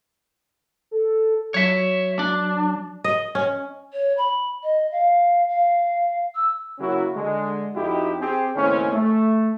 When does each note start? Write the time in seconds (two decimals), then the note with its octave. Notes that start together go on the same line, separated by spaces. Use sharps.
0.91 A4
1.54 F#3 C#5 E5
2.19 D4
3.04 D#5
3.35 C#4
3.92 C#5
4.17 B5
4.63 D#5
4.91 F5
5.48 F5
6.35 E6
6.79 C#3 F#3 A#3 C#4 E4 F#4
7.16 D3 G#3
7.75 F2 D#4 E4 F#4 G4
8.20 C4 G4 G#4
8.55 D#2 A2 C#3 C4 C#4
8.93 A3